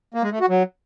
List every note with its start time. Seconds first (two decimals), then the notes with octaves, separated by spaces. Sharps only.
0.14 A#3
0.23 G#3
0.32 A3
0.40 F#4
0.49 F#3